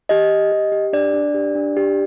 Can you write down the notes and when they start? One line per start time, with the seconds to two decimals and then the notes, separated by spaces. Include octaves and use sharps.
0.09 G4 D#5
0.31 G4
0.52 G4
0.72 G4
0.93 D4 D5
1.14 D4
1.34 G4
1.55 D4
1.77 G4